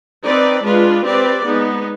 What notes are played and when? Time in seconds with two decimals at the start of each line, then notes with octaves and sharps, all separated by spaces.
0.23 C4 D#4 B4 D5
0.64 G#3 D4 F4 B4
1.04 C4 G4 B4 D5
1.44 G#3 B3 D#4